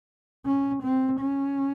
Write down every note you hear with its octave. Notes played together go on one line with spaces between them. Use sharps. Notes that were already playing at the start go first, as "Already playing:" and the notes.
C#4
C4
C#4